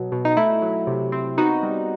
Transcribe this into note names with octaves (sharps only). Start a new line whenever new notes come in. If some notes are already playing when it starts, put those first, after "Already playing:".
Already playing: B2 F#3 B3
B2
D#4
A3 E4
F#3
C3
C4
B3 D#4 F#4
G3